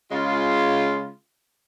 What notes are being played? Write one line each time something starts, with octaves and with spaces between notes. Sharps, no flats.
C#3 G#3 F4